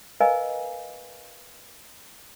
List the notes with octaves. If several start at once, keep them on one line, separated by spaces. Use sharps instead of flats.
A#4 B4 D#5 F5 G#5 A#5